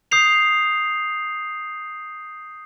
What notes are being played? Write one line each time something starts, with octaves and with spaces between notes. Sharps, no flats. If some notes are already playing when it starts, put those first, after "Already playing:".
D#6 G6 C7 F7